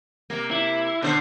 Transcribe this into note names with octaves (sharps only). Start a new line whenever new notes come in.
C3 A#3
E4
B2 D3 C5